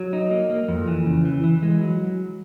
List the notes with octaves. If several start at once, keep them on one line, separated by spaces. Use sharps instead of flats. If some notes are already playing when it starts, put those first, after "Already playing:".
Already playing: F#3
D#4
A#3
A#3
F2
E3
C#3
E3
E3
G#3
F#3